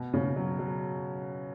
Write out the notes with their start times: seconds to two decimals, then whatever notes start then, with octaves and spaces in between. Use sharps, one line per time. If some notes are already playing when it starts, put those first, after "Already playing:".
Already playing: B2
0.14 C#3
0.36 F#3
0.59 F#3